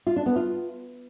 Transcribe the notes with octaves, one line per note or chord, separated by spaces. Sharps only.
F4
D4
B3
F4